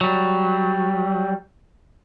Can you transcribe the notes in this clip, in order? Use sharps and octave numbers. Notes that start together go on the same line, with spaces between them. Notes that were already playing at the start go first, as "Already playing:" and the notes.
F#3 G3